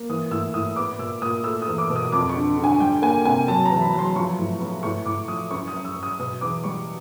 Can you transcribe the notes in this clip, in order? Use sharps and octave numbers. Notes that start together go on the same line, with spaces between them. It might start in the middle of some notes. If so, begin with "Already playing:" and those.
Already playing: A#3
E3 D#6
A2 E6
A2 D#6
B3 D6
A#2 E6
A#2 D#6
A3 E6
D#6
E2
D6
B2
D#6
F2 D6
C#6
D3
D3
G#5
G3 G5
A#3 G#5
C3 G#5
F#3 A5
E2 A#5
B5
F#3 C6
F3 C#6
A2
B3
A2 C#6
A2 D6
F3 D#6
F#2 C#6
D#6
F#2
E6
F#2
D#6
B2 D#6
E2 D6
G3 C#6